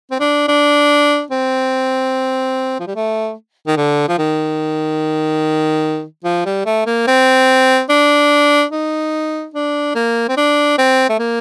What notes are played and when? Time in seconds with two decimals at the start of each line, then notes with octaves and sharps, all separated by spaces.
0.11 C4
0.20 D4
0.48 D4
1.31 C4
2.80 F3
2.87 G3
2.96 A3
3.67 D#3
3.77 D3
4.08 F3
4.18 D#3
6.25 F3
6.46 G3
6.66 A3
6.86 A#3
7.07 C4
7.89 D4
8.72 D#4
9.54 D4
9.95 A#3
10.29 C4
10.37 D4
10.78 C4
11.10 A3
11.19 A#3